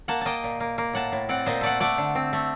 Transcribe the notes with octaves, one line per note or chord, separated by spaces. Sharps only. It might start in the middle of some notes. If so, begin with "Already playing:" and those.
A#3 F#5 A5
A#3 D#5 G5 A5
A#2
A#3
A#3
A2 F#5 A5
A2
C4 D5 F#5
A#2 C5 D#5
A3 D5 F#5
A3 D5 F#5
D3
C4
A3